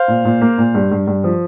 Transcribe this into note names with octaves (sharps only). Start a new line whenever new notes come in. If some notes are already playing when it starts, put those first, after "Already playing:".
Already playing: C5 F5
A#2
A#2
A#3
A#2
G2
G2
G2
F3